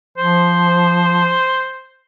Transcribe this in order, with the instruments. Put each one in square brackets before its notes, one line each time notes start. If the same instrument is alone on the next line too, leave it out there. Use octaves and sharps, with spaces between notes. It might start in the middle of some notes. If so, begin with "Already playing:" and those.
[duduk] F3 [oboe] C5